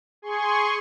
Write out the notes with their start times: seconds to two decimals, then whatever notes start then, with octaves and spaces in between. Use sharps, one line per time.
0.22 G#4 G#5 C6 C#6